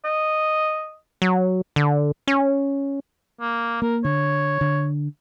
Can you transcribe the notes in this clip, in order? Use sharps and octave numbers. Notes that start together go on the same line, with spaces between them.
D#5
F#3
D3
C#4
A#3
A#3 A#4
D3 C#5
D3